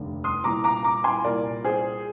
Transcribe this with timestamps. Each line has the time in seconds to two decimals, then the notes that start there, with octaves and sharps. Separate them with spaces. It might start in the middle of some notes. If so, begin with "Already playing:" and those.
Already playing: F1 D#2 D3
0.24 C6 D#6
0.44 C2 A#2 A#5 D6
0.64 A#5 D6
0.84 A#5 D6
1.04 G#5 C6
1.24 C2 A#2 A#4 D5
1.64 G#4 C5